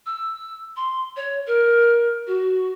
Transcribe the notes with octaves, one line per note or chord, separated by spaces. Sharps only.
E6
C6
C#5
A#4
F#4